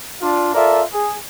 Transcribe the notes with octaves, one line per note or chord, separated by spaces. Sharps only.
D4 F4
F4 A4 A#4 D5 E5
G#4